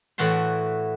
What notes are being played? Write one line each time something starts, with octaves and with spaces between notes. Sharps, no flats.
A2 E3 F#4 A5 C6